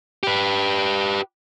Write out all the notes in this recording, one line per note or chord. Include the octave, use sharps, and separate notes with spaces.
G4 B4